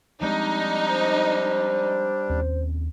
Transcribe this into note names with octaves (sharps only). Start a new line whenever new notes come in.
F3 G3 G#3 C4 D4 D#4
C5
D#2 C4 C#4